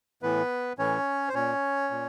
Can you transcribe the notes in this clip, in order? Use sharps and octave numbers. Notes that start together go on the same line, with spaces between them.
A2 E3 B3 B4
A2 E3 C#4 C#5
C5
A#2 C#4 C#5
A#2